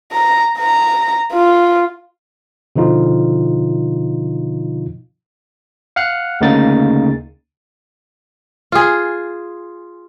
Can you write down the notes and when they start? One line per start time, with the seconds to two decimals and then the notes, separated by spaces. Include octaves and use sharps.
0.12 A#5
0.59 A#5
1.32 F4
2.76 B2 D3 F3 D#4 F4
5.96 F5 F#5 F6 F#6
6.41 D2 C#3 A#3 D#4 A6
8.72 F4 G#4